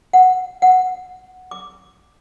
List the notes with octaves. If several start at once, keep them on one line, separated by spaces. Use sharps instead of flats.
F#5
F#5
D6